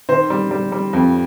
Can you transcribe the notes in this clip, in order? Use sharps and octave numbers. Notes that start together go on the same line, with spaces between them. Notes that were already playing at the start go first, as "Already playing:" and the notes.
D#3 C5
G3
G3
G3
F2